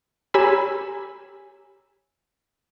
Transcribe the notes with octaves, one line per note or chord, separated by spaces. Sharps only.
G4 C#5 G#5 A#5 B5 E6